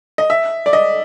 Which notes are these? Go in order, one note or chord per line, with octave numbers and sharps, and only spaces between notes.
D#5
E5
D5
D#5